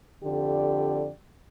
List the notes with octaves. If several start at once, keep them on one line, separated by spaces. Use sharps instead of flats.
F2 D3 G4 D5